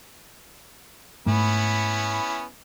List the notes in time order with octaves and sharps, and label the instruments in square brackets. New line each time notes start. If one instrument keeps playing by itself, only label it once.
[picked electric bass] G#2 A3 [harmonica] B3 C#4 E4